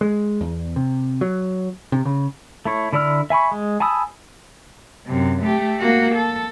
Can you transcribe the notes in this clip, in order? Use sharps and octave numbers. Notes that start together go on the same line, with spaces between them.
G#3
E2
C3
F#3
C3
C#3
A3 E4 C#5
D3 E4 D5 E6 F6
E5 G#5 B5 C#6
G#3
G#5 A5 B5 D#6 E6
F#2 C3
A3 G4
A#3 F#4
A4